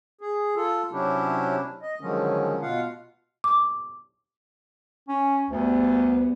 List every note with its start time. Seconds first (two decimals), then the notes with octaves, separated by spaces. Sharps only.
0.21 G#4
0.55 F4 A4
0.92 C3 F#3 C#4 D4 E4 G4
1.82 D#5
2.01 D3 D#3 F3 F#3 G#3 C#4
2.62 B2 F4 F5 F#5
3.44 D6
5.08 C#4
5.50 D2 G3 B3